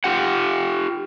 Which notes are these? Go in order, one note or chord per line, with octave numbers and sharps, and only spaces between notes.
F4 G4 F#5